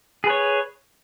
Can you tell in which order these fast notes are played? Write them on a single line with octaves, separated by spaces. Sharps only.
G#4 B4 C#5